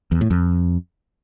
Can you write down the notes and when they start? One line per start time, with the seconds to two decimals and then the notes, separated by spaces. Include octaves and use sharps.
0.12 E2
0.21 A2
0.31 F2